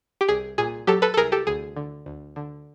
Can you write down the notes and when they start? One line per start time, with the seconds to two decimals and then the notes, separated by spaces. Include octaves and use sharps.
0.21 G4
0.28 C2 G#4
0.58 A#2 G#4
0.87 F#3 G4 A4
1.02 A4 B4
1.14 A4
1.17 C2 G#4 A#4
1.32 G4 A4
1.47 D2 G#4
1.76 D3
2.06 D2
2.36 D3